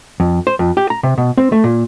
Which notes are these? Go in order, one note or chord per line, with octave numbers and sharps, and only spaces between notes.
F2
C5
F2
G4
A#5
C3
B2
C4
A3
A#2